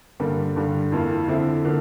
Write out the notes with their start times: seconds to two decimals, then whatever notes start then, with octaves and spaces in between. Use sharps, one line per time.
0.20 G2 D3 G3 A#3
0.56 G2 D3 G3
0.92 F2 E3 A#3 F4
1.28 D3 F3 C4 E4
1.65 D3 F3 A#3